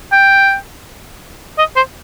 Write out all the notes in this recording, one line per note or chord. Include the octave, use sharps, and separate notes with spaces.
G5
D#5
C5